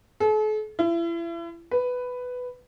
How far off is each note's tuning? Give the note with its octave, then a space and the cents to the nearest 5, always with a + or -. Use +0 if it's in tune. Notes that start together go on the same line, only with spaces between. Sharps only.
A4 -45
E4 +35
B4 +10